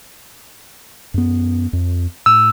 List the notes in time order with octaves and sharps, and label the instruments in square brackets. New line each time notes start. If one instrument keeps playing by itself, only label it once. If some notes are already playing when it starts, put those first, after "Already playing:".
[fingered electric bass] F#2 B3
F2
[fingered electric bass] A2 [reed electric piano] E6